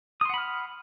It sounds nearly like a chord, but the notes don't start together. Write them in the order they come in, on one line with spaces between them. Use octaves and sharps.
D#6 C6 F#5 B5 F6